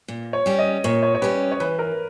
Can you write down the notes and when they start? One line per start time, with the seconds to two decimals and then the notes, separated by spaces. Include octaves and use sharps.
0.08 A#2
0.33 C#5
0.46 G3 C#4 G4
0.59 D#5
0.84 A#2 C#5
1.03 C#5
1.15 C#5
1.22 G3 C#4 G4 B4
1.52 C#5
1.60 E3 B4
1.79 A#4